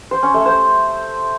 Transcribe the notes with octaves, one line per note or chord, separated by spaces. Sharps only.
C5
C#4
A3
C5